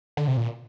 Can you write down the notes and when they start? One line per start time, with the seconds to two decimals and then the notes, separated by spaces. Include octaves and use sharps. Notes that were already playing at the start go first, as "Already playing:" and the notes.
0.17 D3
0.28 C3
0.37 A#2